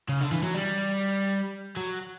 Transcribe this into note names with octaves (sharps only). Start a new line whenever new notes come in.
C#3
D3
E3
F#3
G3
F#3